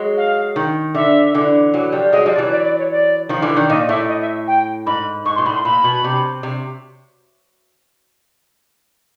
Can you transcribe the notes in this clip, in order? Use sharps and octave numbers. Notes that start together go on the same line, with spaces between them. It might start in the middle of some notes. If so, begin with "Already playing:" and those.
Already playing: F#3 G#3
F5
D#3
D3 E5
D3 E3
E3 F#3
F3 G3
F#3 G#3 D#5
F3 G3
D5
E3 F#3
D5
D5
C#5
D5
D#3 F3
D3 E3
D#3
A#2 D#5
A2 E5
D#5
E5
G5
G#2 B5
G#2 C#6
C6
A#2
A2 B5
C6
A#2 B5
B2
C3
C3